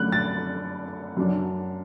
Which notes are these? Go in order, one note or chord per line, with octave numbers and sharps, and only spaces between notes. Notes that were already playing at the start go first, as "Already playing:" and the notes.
Already playing: F#2 D3 A3 F#6
A6
F#2 F#3 D4